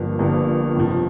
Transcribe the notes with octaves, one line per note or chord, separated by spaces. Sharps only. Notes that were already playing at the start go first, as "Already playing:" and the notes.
Already playing: G1 G2 F3 A#3
G1 G2 F3 A#3
G1 F2 C3 F3